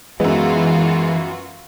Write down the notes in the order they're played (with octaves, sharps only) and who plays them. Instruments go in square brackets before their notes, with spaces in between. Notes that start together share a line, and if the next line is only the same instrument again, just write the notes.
[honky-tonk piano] F#2 B3 [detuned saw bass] E3 [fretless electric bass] G#3 [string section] F4 F#4